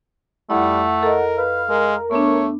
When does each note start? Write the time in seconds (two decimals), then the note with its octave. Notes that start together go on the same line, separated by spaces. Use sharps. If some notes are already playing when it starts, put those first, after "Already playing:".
0.50 F2 G3 A3 E4 F#5
1.03 A4 A#4 D#5
1.38 B4 F5
1.70 G#3 A#4
2.11 A3 B3 D4 C#5